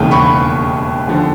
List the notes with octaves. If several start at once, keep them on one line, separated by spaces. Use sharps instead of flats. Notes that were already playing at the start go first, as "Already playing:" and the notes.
Already playing: E1 D#2 C#3 E3 G5
B5 C#6
D#2 D3 F3